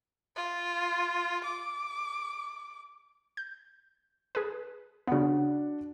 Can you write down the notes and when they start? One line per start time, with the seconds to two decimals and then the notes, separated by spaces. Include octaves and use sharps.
0.36 F4
1.45 D6
3.37 G6
4.35 G#4 B4
5.07 C#3 B3 D4 F#4 F#5